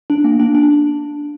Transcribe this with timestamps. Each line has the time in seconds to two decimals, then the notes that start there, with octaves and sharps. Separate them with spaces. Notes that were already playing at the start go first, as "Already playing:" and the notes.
0.10 D4
0.24 A#3
0.40 D4
0.55 D4